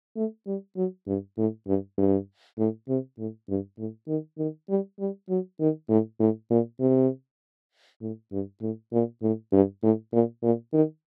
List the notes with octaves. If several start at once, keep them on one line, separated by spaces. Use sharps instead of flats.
A3
G3
F#3
G2
A2
G2
G2
A2
C3
A2
G2
A2
D#3
D#3
G3
G3
F#3
D#3
A2
A2
A#2
C3
A2
G2
A2
A#2
A2
G2
A2
A#2
A#2
D#3